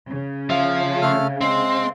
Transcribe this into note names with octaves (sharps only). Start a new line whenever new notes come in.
C#3
F3 E5 F5
A3 A4 F6
G#3 C4 C6